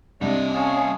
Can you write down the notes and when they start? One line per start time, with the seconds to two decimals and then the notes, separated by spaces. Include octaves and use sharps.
0.21 C2 G3 D4 D#5
0.53 C#4 F5 A5 D#6